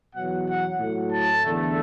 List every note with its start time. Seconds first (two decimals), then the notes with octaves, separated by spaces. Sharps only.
0.14 E2 B2 F#3 F#5
0.47 F#5
0.79 A2 F#3 A3
1.11 A5
1.43 E2 D3 A3